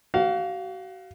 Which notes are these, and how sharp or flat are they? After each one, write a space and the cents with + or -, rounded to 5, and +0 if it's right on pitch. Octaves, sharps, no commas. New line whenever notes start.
F#4 +35 F5 +0